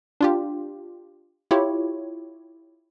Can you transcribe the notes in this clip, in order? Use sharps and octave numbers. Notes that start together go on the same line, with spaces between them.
D4 F4 G4
E4 F4 G4 C#5